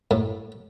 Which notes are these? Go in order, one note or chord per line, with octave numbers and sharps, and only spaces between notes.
A2